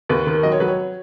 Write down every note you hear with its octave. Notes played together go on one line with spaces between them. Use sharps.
D#2 B4
D#3
F#3 D#5
C#5
F#3 B4
C#5